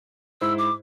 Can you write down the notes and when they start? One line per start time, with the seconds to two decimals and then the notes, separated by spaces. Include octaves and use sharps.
0.41 G#2 E4 C5 E6
0.58 D6